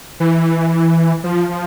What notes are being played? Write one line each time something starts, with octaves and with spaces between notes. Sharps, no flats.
E3
F3
F3